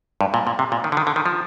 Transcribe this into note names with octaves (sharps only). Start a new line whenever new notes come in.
G2
A#2
A#2
C3
A#2
D#3
D3
D#3
D3
D#3
F3